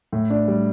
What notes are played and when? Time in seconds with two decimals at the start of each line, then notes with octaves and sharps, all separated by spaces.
0.13 A2
0.30 D4
0.48 G3